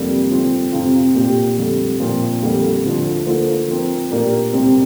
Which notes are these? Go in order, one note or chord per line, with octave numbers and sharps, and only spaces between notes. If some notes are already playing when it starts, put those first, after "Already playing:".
Already playing: F2 C3 G3 A#3 D4
G2 D3 F3 C4
F2 C3 F3 C4 F4
A#2 A#3 G4
F2 D3 G3
A#2 F3 C4
F2 D3 G3 A#3
D2 D3 F3 D4
D3 A#3 F4 C5
F3 C4 A#4
A#2 A#3 D4 G4 A#4
C2 C3 G3 C4